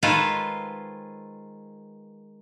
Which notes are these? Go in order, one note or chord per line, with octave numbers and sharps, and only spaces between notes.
D#3 G#3 F4 A4 B4 C5